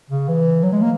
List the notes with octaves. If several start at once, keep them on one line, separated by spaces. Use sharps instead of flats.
C#3
E3
F#3
G#3
A#3